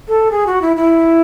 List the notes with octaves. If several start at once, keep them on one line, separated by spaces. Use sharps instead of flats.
A4
G#4
F#4
E4
E4